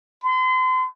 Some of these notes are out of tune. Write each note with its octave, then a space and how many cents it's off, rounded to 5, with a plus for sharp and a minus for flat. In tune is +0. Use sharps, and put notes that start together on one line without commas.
C6 -35